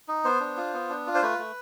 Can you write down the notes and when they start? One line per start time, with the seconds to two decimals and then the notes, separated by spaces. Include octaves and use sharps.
0.08 D#4
0.24 B3 C5
0.40 D4
0.57 F4
0.74 B3
0.89 D4
1.07 F4
1.15 C5
1.23 A3 B4
1.38 A3